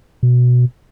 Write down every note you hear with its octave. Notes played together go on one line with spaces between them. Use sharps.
B2